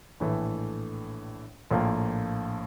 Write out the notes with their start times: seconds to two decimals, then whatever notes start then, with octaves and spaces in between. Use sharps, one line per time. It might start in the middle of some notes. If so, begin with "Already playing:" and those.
0.20 A#1 A2 E3 A3
1.71 A#1 A2 F3 A#3